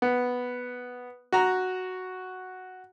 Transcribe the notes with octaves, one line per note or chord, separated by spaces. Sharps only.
B3
F#4 A#5